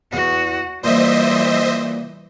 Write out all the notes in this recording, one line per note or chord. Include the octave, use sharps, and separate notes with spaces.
E2 F#4
A#2 E3 G3 C5 D#5 E5